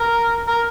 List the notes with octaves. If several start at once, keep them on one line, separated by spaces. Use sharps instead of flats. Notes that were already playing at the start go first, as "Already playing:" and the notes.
Already playing: A#4
A#4